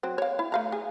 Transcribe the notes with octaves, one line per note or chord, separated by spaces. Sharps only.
F#3 C4
C#5 F5
E4
A3 F5 A#5
G#4